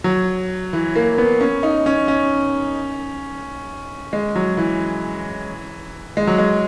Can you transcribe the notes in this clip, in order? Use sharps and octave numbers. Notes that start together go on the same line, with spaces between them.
F#3
E3
A#3
B3
C#4
D#4
C#4
C#4
G#3
F#3
E3
G#3
F#3
G#3